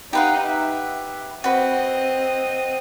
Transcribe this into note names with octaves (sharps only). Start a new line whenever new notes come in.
D#4 G4 B4 F5 F#5
E5
C4 F#4 B4 D#5